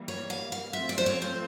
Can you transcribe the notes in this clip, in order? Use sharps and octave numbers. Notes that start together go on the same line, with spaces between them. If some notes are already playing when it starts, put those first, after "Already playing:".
Already playing: E3 G3 A#3
C#5
F5
F5
F3 A3 C4 F4 E5
D5
C5
C#5
C5